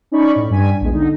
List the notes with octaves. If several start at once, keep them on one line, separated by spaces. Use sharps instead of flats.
C#4 D#4 D5 B5 C#6
A2
G2 G3 G#5 B6 D#7
A#1 E2 G#3
D3 D#4